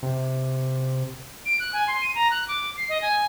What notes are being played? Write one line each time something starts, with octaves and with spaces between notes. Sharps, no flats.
C3
D7
F#6
G#5
C6
D#7
A#5
F#6
D6
C7
D#5
G#5